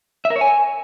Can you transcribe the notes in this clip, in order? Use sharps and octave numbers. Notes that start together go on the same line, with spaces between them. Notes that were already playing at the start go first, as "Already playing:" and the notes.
E5
A#4
C#5
G#5